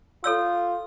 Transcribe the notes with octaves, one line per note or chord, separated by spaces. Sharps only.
F4 A4 C#5 E6